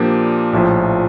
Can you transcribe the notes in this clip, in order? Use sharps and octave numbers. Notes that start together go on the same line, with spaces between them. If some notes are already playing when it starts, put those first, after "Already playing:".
Already playing: A#2 F3 A#3 D4 G4
A#1 A2 F3